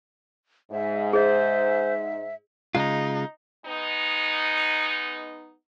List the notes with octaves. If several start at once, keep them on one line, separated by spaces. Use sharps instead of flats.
G#2 E5
G#4 C5 D#5 E5
C#3 G#3 D#4 F4
G#3 B3 D#4